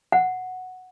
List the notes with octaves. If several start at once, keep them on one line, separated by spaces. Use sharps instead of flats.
F#5